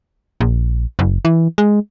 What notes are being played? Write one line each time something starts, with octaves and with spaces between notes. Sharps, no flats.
A#1
F#1
E3
G#3